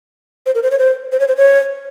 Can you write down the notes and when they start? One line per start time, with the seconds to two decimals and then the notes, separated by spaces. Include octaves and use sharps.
0.46 C5
0.55 A#4
0.63 C5
0.71 C#5
0.79 C5
1.12 C5
1.20 C#5
1.28 C5
1.37 C#5